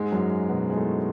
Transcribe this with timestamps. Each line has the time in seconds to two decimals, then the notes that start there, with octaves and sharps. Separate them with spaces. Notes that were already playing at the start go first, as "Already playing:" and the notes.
Already playing: G#2 G#3
0.12 F#2 F#3
0.49 B2 B3
0.70 G#3
0.77 A2 A3